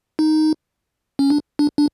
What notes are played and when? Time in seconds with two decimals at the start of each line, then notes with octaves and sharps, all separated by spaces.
0.19 D#4
1.19 C#4
1.30 D4
1.59 D4
1.78 D4